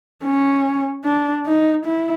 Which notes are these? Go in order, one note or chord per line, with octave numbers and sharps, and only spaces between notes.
C#4
D4
D#4
E4